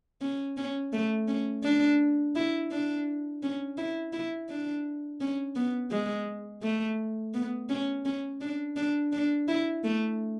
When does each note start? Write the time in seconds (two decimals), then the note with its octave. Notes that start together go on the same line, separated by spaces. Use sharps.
0.21 C#4
0.57 C#4
0.93 A3
1.28 C#4
1.63 D4
2.36 E4
2.71 D4
3.43 C#4
3.78 E4
4.13 E4
4.49 D4
5.21 C#4
5.56 B3
5.91 G#3
6.62 A3
7.34 B3
7.69 C#4
8.05 C#4
8.41 D4
8.76 D4
9.12 D4
9.48 E4
9.84 A3